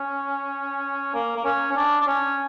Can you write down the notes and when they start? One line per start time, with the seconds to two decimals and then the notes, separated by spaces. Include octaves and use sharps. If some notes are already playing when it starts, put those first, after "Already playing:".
Already playing: C#4
1.14 A#3
1.37 A#3
1.44 C#4
1.71 C#4
1.76 D4
2.01 D4
2.07 C#4